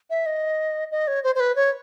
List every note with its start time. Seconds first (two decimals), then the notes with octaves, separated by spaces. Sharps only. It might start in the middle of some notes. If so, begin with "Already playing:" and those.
0.10 E5
0.26 D#5
0.91 D#5
1.08 C#5
1.23 C5
1.35 C5
1.40 B4
1.56 C#5